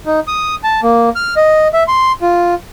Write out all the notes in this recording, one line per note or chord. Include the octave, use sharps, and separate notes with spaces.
D#4
D#6
A5
A#3
F6
D#5
E5
C6
F4